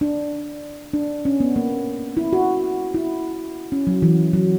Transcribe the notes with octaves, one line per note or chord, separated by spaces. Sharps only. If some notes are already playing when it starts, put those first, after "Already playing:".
D4
D4
C#4
B3
A#3
E4
F#4
E4
C#4
F#3
E3
F#3